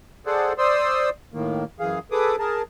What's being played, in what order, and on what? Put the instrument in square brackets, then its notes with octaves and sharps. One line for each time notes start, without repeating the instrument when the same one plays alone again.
[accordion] G#4 A4 C5 D5 F#5
C5 D5 C6 D#6 E6
A2 D#3 A#3
F#2 E3 G#4 F5
G#4 A4 B4 D6 D#6
G#4 A#4 A5